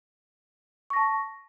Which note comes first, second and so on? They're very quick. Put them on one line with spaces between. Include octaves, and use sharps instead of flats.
C#6 A#6 A5